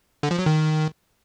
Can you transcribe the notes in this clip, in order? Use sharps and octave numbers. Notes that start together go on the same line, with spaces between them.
D3
F3
F#3
D#3